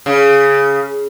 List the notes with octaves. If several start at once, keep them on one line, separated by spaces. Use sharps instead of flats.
C#3